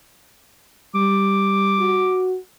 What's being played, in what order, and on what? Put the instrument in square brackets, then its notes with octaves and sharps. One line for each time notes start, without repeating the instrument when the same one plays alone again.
[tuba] G3 [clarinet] D6
[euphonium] F#4